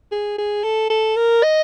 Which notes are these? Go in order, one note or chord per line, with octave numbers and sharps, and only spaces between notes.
G#4
G#4
A4
A4
A#4
D#5